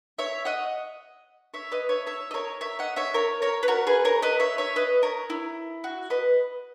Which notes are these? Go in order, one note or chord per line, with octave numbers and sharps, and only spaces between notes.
C#5 E5
D#5 F#5
C#5 E5
B4 D#5
C#5 E5
C#5 E5
D#5
A#4 C#5
C#5 E5
D#5 F#5
C#5 E5
A#4 C#5
A#4 C#5
B4
F#4 A#4
G#4 B4
A#4 C#5
B4 D#5
C#5 E5
C#5 E5
B4 D#5
A#4 C#5
E4
F#4
B4 D#5